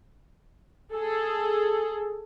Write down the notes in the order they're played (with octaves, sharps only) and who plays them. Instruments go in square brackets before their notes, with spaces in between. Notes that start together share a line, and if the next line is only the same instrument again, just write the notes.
[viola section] G#4 A4